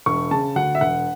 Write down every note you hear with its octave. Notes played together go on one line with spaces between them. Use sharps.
E1 C#6
C#3 A5
D2 F#5
E5
E1 F#5